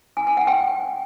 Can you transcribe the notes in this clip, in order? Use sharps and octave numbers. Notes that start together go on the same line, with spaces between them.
G#5
G#5
F#5
G5